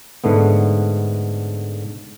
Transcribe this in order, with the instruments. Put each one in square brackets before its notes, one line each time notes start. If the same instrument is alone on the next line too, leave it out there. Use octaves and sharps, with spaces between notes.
[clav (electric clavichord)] G#2 D3 A3 B3